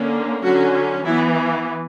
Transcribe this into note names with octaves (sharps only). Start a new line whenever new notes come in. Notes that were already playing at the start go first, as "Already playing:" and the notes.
Already playing: D3 A#3 C#4
D3 F#3 C#4 F#4
E3 B3 E4